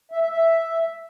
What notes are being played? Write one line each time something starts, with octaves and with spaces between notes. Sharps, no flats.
E5
E5
E5